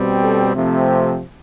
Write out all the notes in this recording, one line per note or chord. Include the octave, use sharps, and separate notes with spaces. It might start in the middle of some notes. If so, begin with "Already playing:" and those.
Already playing: B2 G3 C4
A4
C3 F3 A3 C4
G4